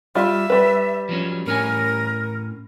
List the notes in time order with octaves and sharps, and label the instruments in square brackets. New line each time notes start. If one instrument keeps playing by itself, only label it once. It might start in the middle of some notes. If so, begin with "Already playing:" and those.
[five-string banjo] G3 F4 [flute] E5
[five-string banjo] G3 B4
[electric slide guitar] F3 F#3 C#4
[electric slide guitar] A2 C#4 G#5 [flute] A#4